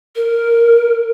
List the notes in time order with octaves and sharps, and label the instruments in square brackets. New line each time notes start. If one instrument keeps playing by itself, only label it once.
[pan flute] A#4